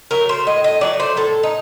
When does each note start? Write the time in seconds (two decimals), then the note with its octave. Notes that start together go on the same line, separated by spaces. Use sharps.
0.11 F#3 A3 A#4
0.29 C5
0.47 A2 D#5
0.64 D#5
0.81 F#3 A3 D5
1.00 C5
1.17 A2 A4
1.43 D#4